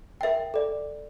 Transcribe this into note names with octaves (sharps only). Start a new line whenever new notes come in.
A#4 E5 G5
A4 D5